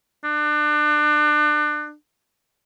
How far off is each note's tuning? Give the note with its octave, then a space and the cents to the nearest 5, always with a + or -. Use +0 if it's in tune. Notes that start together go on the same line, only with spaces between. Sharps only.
D4 +30